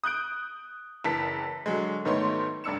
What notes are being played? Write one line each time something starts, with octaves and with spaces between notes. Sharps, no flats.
D#6 F#6 G6 D7
F#1 E3 A5 B6
D3 F#3 G#3
G#2 D#3 A3 B3 C#5 C6
F1 G2 D4 E6 C#7 E7